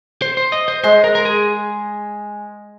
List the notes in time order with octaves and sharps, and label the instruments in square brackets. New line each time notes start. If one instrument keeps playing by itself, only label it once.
[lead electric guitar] C5
C5
D#5
C5
[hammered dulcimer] G#3 [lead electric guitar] C5
[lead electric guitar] A#4
A#4
G#4